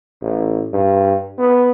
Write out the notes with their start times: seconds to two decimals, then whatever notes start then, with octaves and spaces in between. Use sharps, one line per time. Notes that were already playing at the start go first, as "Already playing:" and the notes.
0.22 A1
0.73 G2
1.39 B3